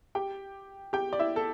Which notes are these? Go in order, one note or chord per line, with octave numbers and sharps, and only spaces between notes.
G4 G5
G4 G5
D5
E4 E5
A4